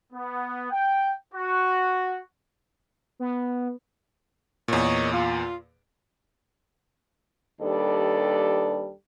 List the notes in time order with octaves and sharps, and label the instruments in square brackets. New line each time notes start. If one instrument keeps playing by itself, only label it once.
[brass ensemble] B3
G5
F#4
[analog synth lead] B3
[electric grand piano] E2 A#2 [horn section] A#4 C#5 D#5
[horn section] F4
[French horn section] D#2 G3 D4 A4 B4 D5